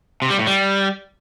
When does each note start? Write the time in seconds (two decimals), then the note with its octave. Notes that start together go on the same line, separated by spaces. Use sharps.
0.22 C3
0.30 G3
0.39 A2
0.47 G3